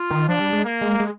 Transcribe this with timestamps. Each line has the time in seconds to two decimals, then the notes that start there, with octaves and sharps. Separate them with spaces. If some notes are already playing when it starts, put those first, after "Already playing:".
Already playing: F4
0.10 D#3
0.28 F3 D4
0.40 G3
0.53 G#3
0.65 A#3
0.81 G#3
1.00 G#3